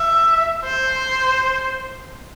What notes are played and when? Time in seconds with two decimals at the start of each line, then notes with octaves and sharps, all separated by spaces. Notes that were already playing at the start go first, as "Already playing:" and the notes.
Already playing: E5
0.65 C5